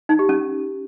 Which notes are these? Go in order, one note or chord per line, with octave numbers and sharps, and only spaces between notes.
D#4
G4
C#4